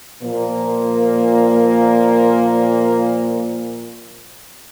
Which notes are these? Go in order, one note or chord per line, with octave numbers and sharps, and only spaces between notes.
A#2 F3 A#3